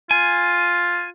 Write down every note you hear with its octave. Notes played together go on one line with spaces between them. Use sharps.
F4 G#5